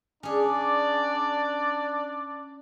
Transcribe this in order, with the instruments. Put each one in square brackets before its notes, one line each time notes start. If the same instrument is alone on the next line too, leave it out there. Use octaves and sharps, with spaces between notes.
[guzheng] C#4 G#4 [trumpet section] D4 D5